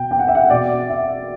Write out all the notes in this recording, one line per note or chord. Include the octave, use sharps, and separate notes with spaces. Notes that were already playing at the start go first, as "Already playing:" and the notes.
Already playing: B2 G5
G5
F#5
E5
F#5
B2 D5
E5